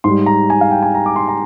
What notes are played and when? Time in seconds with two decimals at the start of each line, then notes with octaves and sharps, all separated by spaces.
0.04 G#2 G3 C6
0.26 A#5
0.50 G#5
0.61 F5
0.71 G5
0.83 G#5
0.94 A#5
1.06 D6
1.16 C6
1.28 A#5